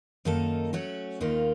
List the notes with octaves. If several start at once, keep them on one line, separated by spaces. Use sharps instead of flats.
F#2 D#3 A#3 D#4 A4
F#3 A3 C#4 F#4
D#2 D#3 A#3 F4